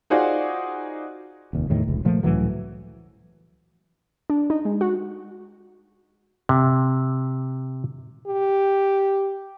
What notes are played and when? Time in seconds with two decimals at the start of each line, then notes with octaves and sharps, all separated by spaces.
0.10 D#4 F4 F#4 G#4 C5 D5
1.53 F1 D#2
1.70 E2 A2 D#3
1.87 F1 C#2
2.05 A#2 F3 A3
2.23 C#2 A2 E3 F#3
4.30 D4
4.50 D#4
4.65 G#3
4.81 F#4
6.49 C3
8.27 G4